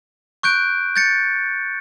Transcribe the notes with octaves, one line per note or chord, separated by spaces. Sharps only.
C#6 F#6 G6 D7
G6 A6 C#7